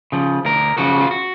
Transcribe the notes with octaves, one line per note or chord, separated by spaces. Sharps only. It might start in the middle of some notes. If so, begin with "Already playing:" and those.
C#3 F3
D2 A#4
C#3 F3 F#4
F4
F#4